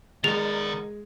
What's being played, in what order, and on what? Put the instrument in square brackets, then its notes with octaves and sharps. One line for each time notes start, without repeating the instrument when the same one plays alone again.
[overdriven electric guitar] D#3 D5 [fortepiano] G#3 [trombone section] B3 D#4 A#4 [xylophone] F7